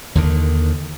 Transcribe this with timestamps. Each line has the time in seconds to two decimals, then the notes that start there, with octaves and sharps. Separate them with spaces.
0.15 D#2 D3 D#3